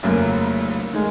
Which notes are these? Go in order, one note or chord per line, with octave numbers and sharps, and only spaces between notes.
F1 F2 C#3 F#3 A#3
D#3 G#3